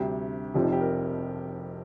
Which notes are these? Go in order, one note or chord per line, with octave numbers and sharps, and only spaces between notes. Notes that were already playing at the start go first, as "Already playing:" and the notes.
Already playing: D2 C3 G3 G4
F1 F2 C3 F3 G4
D#4
G4
A#4